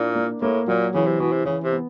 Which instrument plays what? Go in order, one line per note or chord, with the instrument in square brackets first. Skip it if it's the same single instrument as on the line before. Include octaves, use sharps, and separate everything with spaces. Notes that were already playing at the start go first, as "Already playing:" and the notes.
Already playing: [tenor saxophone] A#2 [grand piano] D4 E4
[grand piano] A#3
[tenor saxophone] A2 [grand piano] A#3
[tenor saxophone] A#2 [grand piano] F#3
[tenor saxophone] C#3 [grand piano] E3
[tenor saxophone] C3
[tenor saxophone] B2 [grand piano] E3
[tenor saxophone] C3
[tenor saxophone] C#3 [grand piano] E3
[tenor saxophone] C3
[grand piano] B3